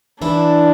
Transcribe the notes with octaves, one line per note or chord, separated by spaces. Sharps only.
E3 D4 E4